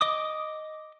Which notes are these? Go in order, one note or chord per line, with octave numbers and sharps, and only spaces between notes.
D#5 D6 D#6